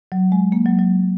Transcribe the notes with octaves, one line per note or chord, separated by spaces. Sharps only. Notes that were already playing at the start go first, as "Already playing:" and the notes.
F#3
G#3
A#3
F#3
F#3